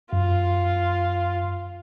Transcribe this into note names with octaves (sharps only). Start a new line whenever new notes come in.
F#2 F4